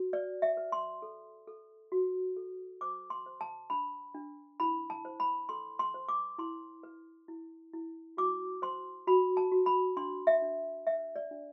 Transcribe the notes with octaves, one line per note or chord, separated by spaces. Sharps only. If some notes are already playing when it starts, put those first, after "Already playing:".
Already playing: F#4
B4 D5
E5
B4
C6
A4
A4
F#4
A4
C5 D6
C6
C5
A5
D4 B5
D4
E4 B5
A5
C5
B5
A4 C6
C6
C5
D6
E4 C6
B4
E4
E4
F#4 D6
C5 C6
F#4 B5
A5
F#4
B5
D4 C6
E5
D4
B4 E5
D5
D4